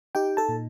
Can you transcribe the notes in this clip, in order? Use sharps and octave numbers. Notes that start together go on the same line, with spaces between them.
D#4 G4 G5
A4 A5
A#2